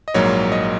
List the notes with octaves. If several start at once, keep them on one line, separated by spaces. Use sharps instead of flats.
D#5
A#1 G#2 F#3 A#3 C#5
D#5